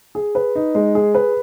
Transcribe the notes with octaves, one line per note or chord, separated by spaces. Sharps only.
G#4
B4
D#4
G#3
G#4
B4